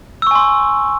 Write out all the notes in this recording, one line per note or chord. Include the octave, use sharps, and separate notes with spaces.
G#5 C6 C#6 E6